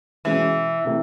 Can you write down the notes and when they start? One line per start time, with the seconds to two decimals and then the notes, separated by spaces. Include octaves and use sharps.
0.25 B2 E3 G#3 C#4
0.84 C3 E3 A3